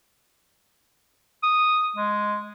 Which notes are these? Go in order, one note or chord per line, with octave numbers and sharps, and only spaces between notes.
D#6
G#3